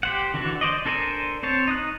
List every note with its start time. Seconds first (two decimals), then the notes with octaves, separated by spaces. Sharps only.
0.03 G4 C5 F#5
0.34 D3 E3 D4 F#4 A4
0.61 C5 D5 D#5
0.86 D4 A4 A#4 C5 G#5
1.43 C4 C5 C#5 A5
1.67 D#4 D#6 F#6